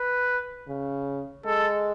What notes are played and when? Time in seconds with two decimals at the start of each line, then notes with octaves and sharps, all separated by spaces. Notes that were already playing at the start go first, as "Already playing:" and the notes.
Already playing: B4
0.68 C#3
1.45 G#3 A4